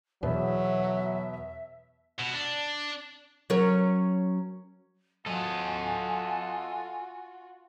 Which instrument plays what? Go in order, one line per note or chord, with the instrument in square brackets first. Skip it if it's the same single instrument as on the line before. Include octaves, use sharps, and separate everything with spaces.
[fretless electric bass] E2 [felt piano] B2 B3 [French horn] F#3 [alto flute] E5
[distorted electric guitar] B2
D4
[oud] F#3 C#4 A#4
[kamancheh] F4 F#4 [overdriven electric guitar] A4 D#5 [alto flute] G#5